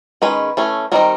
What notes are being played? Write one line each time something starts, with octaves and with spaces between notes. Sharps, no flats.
D#3 G#3 C#4 B4
E3 A3 C#4
D#3 G3 C4 D#4 A#4